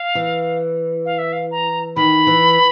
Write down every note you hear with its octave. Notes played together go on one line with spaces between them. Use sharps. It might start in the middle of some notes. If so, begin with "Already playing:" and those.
Already playing: F5
E3
F5
E5
F5
A#5
D#3 B5
E3